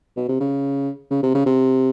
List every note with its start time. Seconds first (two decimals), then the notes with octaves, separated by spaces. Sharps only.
0.17 B2
0.29 C3
0.40 C#3
1.11 C#3
1.23 C3
1.35 C#3
1.46 C3